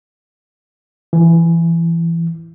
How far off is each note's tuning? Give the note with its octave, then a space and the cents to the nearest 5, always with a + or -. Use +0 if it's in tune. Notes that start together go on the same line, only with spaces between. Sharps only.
E3 +20